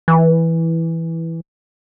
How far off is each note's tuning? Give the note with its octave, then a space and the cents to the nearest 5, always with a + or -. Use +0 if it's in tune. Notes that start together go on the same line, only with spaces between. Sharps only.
E3 -5